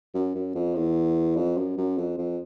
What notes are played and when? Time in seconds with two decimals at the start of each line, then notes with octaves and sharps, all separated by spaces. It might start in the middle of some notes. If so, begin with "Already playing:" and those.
0.14 F#2
0.35 F#2
0.55 F2
0.75 E2
1.36 F2
1.57 F#2
1.77 F#2
1.98 F2
2.18 F2